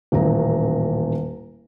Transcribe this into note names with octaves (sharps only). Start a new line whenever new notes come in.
D#1 A1 A#3 A#5